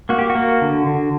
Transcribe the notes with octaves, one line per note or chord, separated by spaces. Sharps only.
A#3 F#4
G4
F#4
A#3
D3
D3